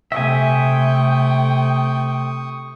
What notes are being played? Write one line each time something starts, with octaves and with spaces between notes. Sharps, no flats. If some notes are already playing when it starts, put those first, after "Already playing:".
C3 A3 E5 G5 G#5 C#6 D#6